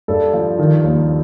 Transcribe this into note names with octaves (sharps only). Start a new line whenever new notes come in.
G2 A4
F3
D#3
D#2